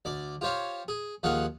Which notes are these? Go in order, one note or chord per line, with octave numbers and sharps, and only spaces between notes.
D2 D5 D6
F4 G4 C5 C#5 F5
G#4
D#2 F3 G#4 F5 F#5 C#6